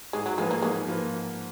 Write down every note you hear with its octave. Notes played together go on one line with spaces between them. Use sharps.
G#2 G#3
F#3
F3 G#3 A#3 F4 B4
A#3
G#2 G#3
F3 A#3 F4 B4